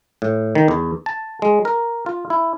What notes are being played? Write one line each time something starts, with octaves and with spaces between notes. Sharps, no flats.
A2
D#3
E2
A5
G#3
A#4
F4
E4